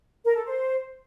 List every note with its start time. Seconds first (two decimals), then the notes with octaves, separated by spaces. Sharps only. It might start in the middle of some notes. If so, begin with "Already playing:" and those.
0.25 A#4
0.35 A4
0.46 C5